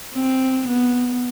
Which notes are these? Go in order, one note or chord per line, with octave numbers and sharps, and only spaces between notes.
C4
B3